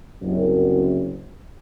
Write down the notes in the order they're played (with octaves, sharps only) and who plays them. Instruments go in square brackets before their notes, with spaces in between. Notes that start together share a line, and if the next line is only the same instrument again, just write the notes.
[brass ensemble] F#1 C2 F#2